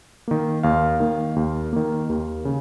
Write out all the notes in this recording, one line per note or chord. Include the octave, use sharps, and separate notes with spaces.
D#3 A#3
D#2 F5
D#3 A#3
D#2
D#3 A#3
D#2
C#3